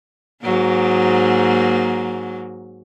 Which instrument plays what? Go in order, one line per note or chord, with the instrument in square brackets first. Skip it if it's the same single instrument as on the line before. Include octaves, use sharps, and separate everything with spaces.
[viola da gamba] G#2 F#3 A#3